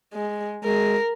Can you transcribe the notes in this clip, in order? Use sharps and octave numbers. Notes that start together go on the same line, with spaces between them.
G#3
G#3 A#4